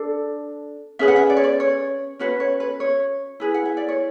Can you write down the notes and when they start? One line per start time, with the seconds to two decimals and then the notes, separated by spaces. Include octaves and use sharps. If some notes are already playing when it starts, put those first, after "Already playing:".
Already playing: D4 A4
0.99 C#4 G#4 B4 E5
1.08 F#5
1.16 E5
1.30 D5
1.37 C#5
1.44 D5
1.60 C#5
2.19 C#4 F#4 B4 C#5
2.40 C#5
2.60 B4
2.80 C#5
3.40 E4 G#4 B4
3.54 F#5
3.65 E5
3.77 D5
3.89 C#5